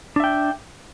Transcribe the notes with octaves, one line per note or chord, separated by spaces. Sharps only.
D4 E5 G5